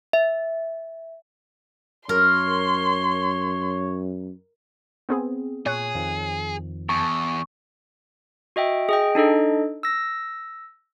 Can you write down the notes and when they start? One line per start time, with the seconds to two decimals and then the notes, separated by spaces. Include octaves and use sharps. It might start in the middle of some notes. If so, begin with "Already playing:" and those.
0.13 E5
2.09 F#2 A#4 C#5 C6
5.09 B3 C4 G#4
5.66 A#2 G#4 C#5 F#6
5.95 F2 D#3 F3
6.89 E2 A5 C#6
8.56 F#4 D#5 E5 G5
8.89 G#4 D#5 G5
9.15 D4 D#4 A4 D#5
9.83 E6 A#6